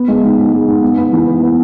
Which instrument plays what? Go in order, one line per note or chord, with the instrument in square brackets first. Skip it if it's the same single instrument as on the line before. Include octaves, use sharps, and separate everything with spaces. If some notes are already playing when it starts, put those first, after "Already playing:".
Already playing: [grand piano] B3
G#3
G#2
G#2
G#3
G#2
B3
B3
E3
B3
B3